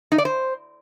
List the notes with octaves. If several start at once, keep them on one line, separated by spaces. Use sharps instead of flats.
D#4
D5
C5